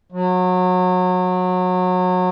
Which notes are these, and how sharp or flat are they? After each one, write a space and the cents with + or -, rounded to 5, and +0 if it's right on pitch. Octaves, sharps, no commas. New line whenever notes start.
F#3 -25